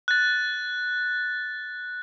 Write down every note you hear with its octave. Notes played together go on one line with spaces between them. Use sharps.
F#6 A6